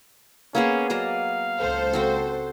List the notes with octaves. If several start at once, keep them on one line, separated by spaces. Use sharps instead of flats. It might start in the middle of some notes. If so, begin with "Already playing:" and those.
A#3 B3 C#4 G#4
F#3 D5 D#5 F5
C#2 A4 C5
C4 F#4 G5